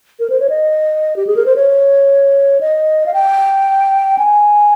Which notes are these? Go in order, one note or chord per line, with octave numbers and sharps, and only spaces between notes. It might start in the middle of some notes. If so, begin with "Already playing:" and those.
A#4
C5
C#5
D#5
G4
G#4
A#4
C5
C#5
D#5
F5
G5
G#5